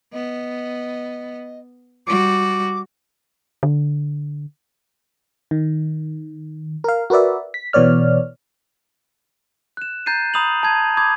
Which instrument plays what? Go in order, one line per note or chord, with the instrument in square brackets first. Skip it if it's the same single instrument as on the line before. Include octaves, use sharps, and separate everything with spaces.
[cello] B3 [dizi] D#5
[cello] G3 F#4 [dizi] D6
[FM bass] D3
[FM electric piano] D#3
A#4 F5
F#4 A#4 B4 D5 E5
B6
B2 E3 B3 C#5 D5 F6
[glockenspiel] F#6 E7
A#5 G6 A6 C7 D#7
A#5 B5 D#6 G6 F7 F#7
A5 G#6
A#5 B5 D6 D#6 G6 G#6